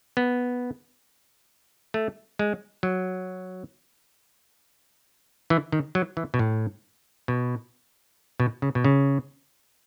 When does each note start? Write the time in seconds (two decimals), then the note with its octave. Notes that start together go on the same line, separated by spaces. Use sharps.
0.17 B3
1.94 A3
2.39 G#3
2.83 F#3
5.50 E3
5.72 D#3
5.95 F#3
6.17 E3
6.34 B2
6.39 A2
7.28 B2
8.40 B2
8.62 C#3
8.75 B2
8.84 C#3